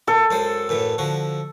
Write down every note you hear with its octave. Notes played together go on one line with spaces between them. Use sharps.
A#2 A4
F#2 G#3 C5
F#2 A2 E3
D3 F3 F#4